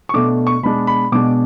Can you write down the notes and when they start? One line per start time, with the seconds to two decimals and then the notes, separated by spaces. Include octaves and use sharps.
0.09 C#6
0.14 B2 A3 D4 D6
0.47 C#6
0.63 B2 G#3 D4 B5
0.87 B5
1.12 B2 G#3 D4 D6